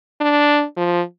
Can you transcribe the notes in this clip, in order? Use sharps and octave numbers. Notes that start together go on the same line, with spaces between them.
D4
F3